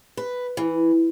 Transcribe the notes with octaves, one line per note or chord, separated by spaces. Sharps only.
B4
E3